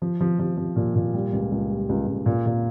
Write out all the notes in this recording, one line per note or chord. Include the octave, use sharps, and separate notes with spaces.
F3
F3
F3
F3
A#2
A#2
G3
C#2
C#2
G3
C#2
C#2
A#2
A#2